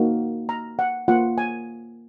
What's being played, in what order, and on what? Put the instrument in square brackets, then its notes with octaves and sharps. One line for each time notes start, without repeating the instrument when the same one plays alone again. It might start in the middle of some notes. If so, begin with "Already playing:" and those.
Already playing: [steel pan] A#3 D#4 F#4
A#5
F#5
A#3 F4 F#5
G#5